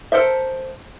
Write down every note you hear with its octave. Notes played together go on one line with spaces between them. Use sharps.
A4 A#4 C5 E5